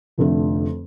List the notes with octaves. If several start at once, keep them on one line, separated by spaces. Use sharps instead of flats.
F1 F2 D3 A3